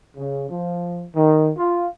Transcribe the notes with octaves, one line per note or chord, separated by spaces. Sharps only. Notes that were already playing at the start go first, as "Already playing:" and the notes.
C#3
F3
D#3
F4